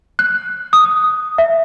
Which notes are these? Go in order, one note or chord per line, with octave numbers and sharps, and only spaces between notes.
F#6
D#6
E5